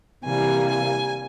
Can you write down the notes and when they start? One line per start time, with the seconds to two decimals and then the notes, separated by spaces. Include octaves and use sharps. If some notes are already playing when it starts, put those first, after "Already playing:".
0.24 C3 E3 G3 A#3 G#5
0.67 G#5